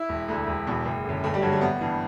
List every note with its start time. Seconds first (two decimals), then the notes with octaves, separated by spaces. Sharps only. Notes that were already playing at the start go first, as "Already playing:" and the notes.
Already playing: E4
0.09 E1
0.28 D2 D3
0.47 E1
0.67 E2 B2
0.86 F#1
1.04 F#2 D3
1.24 G1 A3
1.34 G3
1.42 G2 D3 F#3
1.52 A3
1.61 A1 B3
1.81 G2 E3